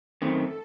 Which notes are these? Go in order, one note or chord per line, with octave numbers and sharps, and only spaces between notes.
F#2 D#3 A3 C4 A4